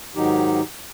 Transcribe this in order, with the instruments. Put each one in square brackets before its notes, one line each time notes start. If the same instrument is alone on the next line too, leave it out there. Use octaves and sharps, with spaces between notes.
[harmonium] G#2 D#3 F#3 D#4 G4